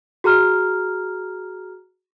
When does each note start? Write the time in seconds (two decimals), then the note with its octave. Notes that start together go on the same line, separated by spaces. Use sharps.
0.24 F#4 G#4 A#5 F6